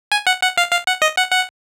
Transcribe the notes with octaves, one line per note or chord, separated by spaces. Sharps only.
G#5
F#5
F#5
F5
F5
F#5
D#5
F#5
F#5